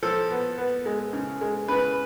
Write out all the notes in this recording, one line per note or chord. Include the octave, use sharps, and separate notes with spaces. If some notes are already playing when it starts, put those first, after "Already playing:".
F3 A4
B3
B3
G#3
C#3
G#3
C#3 B4